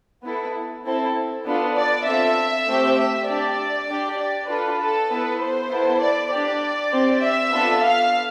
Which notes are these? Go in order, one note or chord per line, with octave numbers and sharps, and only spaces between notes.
B3 E4 A4
C4 E4 A4
B3 D4 F4 A4
D5
C4 F4 A4 E5
A3 C4 G4
E5
D4 G4 D5
D4 G4
D5
D4 F4 A4 B4
A4
B3 E4 A4 B4
C5
B3 E4 A4
D5
D4 G4 D5
C4 G4
E5
B3 D4 F4 A4
F5